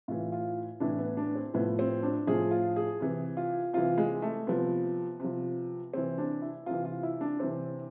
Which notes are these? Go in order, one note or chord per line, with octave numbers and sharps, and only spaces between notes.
A2 E3 F4
F4
A2 E3 D4
B3
D4
C4
A2 F3 B3
C4
D4
A2 F3 G#4
F4
G#4
C3 E3
F4
C3 E3 F4
G#3
A3
C3 F3 B3
C3 F3
C3 E3 C4
D4
E4
C3 E3 F4
F4
E4
D4
C3 E3 C4